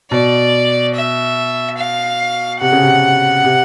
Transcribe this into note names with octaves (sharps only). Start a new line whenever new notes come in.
B2 D5
E5
F5
C3 F#5
C#3
C3
C3